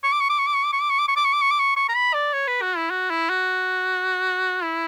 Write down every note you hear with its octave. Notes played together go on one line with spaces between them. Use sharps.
C#6
D6
C#6
D6
C#6
D6
C#6
D6
C#6
D6
C#6
D6
C#6
D6
C#6
D6
C#6
D6
C#6
C#6
A#5
B5
D5
C#5
B4
F#4
E4
F#4
E4
F#4
E4